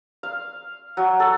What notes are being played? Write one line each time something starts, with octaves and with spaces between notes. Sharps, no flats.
F5
F#3
A4